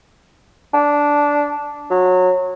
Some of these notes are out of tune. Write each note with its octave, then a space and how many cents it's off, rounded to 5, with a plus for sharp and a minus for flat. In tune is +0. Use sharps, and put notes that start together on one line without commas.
D4 -10
F#3 -20